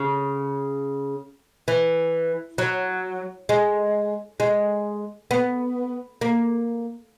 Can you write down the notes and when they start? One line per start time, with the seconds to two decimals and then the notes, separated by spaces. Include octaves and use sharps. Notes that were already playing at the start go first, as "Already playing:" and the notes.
Already playing: C#3
1.68 E3
2.58 F#3
3.49 G#3
4.40 G#3
5.31 B3
6.21 A#3